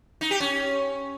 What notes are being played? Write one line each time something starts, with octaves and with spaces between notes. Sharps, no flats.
D#4
G4
C#4